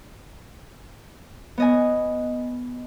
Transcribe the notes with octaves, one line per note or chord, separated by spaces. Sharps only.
B3 D#5 G#5